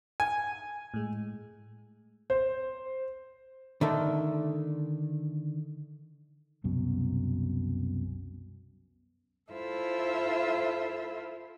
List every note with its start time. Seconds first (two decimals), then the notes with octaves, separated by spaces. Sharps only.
0.20 G#5
0.94 A2 G#3
2.30 C5
3.81 D3 D#3 A3
6.64 C2 F#2 B2
9.52 E4 F4 A4 C5 E5